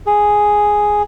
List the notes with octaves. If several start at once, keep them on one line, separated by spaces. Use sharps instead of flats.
G#4